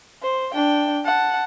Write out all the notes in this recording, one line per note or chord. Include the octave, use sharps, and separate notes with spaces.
C5
D4 G5
F#5 A5